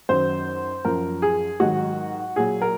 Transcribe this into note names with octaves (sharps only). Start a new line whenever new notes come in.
F#2 D#3 F#3 C5
F#2 F3 A#4
G#4
G#2 D#3 F#3 F#4
A#2 F#3 G#4
A#4